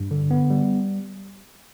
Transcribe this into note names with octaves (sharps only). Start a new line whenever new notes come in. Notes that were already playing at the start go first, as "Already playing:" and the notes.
Already playing: G2
D3
B3
G3